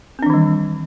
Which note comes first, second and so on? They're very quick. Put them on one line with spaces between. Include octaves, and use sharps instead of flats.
C4 D4 E3 D#3 G3